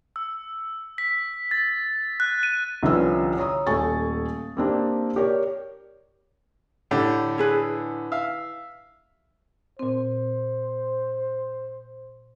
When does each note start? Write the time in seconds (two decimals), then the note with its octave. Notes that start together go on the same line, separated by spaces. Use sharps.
0.16 E6
0.98 B6
1.51 A6
2.20 F#6
2.43 D#7
2.83 C2 D3 F3 C#4 B4 E6
3.38 C#5 A#5 D#6
3.67 D#1 A3 G#5 C#6 A6
4.57 A#3 C4 D4 G4
5.16 G4 A#4 C#5 D5
6.91 A2 D3 G4
7.38 E4 G#4 B4
8.12 E5 F5
9.79 A#2 C4 C5